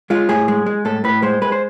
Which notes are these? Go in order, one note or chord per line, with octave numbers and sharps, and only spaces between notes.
G#3 F4
A2 G#4
G#3
G#3
A2 A4
A2 B4
G#3 C5
G#3 B4
C5